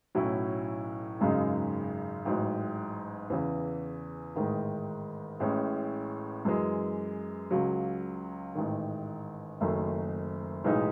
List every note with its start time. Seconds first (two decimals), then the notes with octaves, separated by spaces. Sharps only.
0.15 B1 A2 F#3 C#4 E4
1.20 G#1 F#2 C#3 G#3 D#4
2.25 A1 G#2 F#3
3.30 E2 C#3 E3
4.35 A1 G#2 D#3 G#3
5.40 A1 A2 G#3 C#4
6.45 F#2 E3 G#3
7.51 C#2 C#3 F#3
8.55 A1 G#2 D#3
9.61 F#1 F#2 D#3 A3
10.64 B1 A2 E3 G#3 D#4